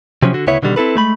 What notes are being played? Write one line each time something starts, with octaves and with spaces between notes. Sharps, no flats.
C3 F3 F#3 C#4
D3 F#4
D2 C#3 B3 E4 C#5 E5
B2 D3 D#3 G3
C4 E4 A4 B4
G#3 A3 B5